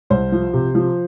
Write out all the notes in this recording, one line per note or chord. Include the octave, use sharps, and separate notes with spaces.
C2 C5
F3
C3
F3